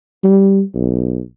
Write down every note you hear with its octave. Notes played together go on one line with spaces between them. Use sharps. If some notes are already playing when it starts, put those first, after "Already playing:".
G3
B1